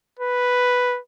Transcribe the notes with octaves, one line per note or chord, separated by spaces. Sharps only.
B4